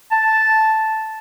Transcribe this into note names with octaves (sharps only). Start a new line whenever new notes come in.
A5